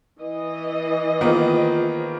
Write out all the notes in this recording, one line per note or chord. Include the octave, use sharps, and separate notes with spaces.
E3 D#5
D#3 A#3 B3 F4 G#4 C5